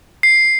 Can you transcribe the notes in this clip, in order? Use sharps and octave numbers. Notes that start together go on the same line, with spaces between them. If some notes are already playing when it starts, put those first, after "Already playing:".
C7